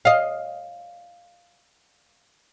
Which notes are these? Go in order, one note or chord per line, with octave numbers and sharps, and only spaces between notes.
D#5 F5